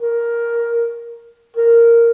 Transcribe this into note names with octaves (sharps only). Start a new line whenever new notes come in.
A#4
A#4